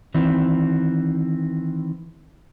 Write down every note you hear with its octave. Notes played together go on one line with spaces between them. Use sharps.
D#3 E3 C4